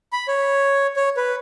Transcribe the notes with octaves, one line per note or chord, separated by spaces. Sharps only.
B5
C#5
C#5
B4